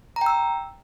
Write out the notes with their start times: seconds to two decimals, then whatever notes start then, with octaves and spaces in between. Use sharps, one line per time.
0.16 A#5
0.21 G5
0.26 E6